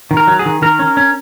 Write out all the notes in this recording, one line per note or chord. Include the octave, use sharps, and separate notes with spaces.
D#3
A#4
F#3
G#4
D#3
D#3 A#4
C#4
C#4